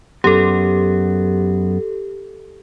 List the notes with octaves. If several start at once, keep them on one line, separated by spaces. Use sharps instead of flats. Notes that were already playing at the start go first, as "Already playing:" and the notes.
F#2 B3 G4 A4